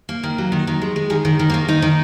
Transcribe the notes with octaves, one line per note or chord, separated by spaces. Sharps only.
A#3
D#3
F#3
D#3
D#3
G#3
G#3
D#3 G#4
D#3
D#3
A#3
D#3
D#3 D#4
D#3